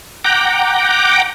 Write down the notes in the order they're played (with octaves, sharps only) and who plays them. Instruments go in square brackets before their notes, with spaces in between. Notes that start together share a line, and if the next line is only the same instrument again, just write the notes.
[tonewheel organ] F#5 G5 A#5 D6